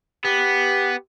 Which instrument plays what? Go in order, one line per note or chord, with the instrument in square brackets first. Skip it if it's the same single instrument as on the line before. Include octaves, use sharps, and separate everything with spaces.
[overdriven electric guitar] B3 [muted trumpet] G4